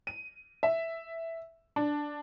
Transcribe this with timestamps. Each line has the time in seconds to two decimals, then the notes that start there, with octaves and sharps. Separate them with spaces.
0.07 D#7
0.63 E5
1.76 D4